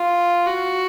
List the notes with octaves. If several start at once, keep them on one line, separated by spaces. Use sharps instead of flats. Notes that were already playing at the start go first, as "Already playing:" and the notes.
Already playing: F4
F#4